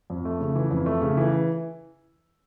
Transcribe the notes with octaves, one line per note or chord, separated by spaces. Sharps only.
F2
A3
C#3
E3
F2
A3
C#3
E3